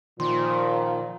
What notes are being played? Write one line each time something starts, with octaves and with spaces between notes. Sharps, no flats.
A#2 D#3 F3 C6